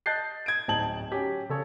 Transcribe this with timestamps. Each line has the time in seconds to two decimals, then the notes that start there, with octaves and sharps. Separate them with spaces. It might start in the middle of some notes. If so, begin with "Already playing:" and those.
0.06 D#5 A5 F#6 G6 A6 C7
0.46 G#6 D7
0.68 D1 D#4 A5 G#6 F#7
1.12 F#3 C#4 G4
1.49 C#3 A4 C#5